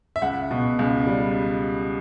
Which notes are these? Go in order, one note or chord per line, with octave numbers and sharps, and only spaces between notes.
E5
C#2 F#5
B2
C#2
G3